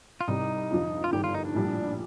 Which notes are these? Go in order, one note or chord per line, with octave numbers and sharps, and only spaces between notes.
F4
C2 C3 G3 D#4
F2 D3 F3
F4
G1 G2 D#3 G4
F4
D#4
D4
A#1 A2 G3